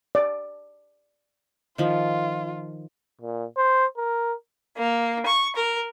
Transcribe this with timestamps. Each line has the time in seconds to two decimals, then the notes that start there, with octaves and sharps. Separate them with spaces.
0.15 D5
1.78 D#3 F3 F4
3.21 A#2
3.57 C5
3.97 A#4
4.75 A#3
5.25 C#6
5.55 A#4